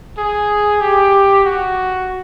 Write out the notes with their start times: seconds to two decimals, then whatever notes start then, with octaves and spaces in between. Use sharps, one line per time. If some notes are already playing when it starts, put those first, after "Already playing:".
0.18 G#4
0.81 G4
1.44 F#4